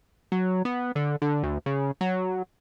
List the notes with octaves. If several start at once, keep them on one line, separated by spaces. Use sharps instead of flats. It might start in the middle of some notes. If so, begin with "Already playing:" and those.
F#3
B3
D3
D3
D2
C#3
F#3